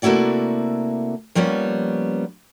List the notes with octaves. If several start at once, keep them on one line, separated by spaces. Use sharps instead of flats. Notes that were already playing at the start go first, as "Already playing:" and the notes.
C3 A3 A#3 E4 F#4 D5
F3 G3 A#3 B3 C#4